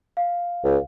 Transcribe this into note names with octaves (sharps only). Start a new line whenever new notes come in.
F5
C#2